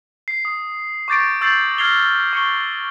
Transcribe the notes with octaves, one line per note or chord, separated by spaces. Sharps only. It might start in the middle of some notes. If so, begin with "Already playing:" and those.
C7
D#6
C#6 D6 G6 A6 A#6 D7
C#6 E6 G6 A6 C7 F#7
F6 G#6 A#6 C7 F7 G7
C#6 C#7 G7